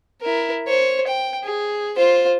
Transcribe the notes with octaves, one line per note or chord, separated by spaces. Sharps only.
E4 A#4
C5 C#5
G5
G#4
F4 C5